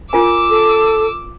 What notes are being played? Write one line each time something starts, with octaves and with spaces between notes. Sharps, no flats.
F4 A#4 G#5 D6 E6
A4